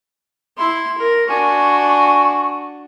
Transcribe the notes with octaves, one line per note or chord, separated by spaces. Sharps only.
E4 C6
A#4
D4 F#4 G#5 C#6